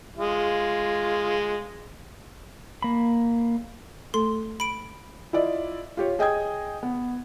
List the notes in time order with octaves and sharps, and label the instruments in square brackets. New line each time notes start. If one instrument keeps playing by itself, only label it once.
[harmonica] G#3 F4
[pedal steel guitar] A#3 B5
[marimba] A3 A4 [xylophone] C6
[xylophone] B5 D7
[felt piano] E4 F4 D5 D#5
F4 G4 C#5
G#4 D#5 G5 D#6 G#6
B3